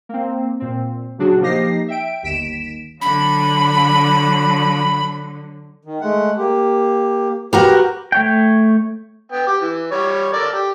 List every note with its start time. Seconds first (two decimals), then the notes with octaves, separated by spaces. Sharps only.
0.09 A#3 C4
0.60 A#2 C4
1.18 A#2 C#3 F#3 D4 F#4 G#4
1.41 F3 A#3 D#4 G4 A#6 C7
1.88 E5 G5 D7
2.22 G1 D#2 B6 D7 E7
3.01 D3 F#3 B5
5.85 D#3
6.01 G#3 A3 F#5
6.38 A#3 G4
7.53 F#4 G4 A#4 B4 F#5
8.12 A3 C#5 G5
9.32 B3 G5
9.47 G4
9.61 E3
9.92 G3 C#5
10.33 A4 A#4 D5
10.53 G4